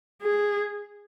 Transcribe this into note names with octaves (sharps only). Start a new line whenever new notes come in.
G#4